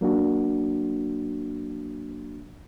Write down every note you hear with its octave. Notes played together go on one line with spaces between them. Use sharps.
F#3 A#3 D4 F#4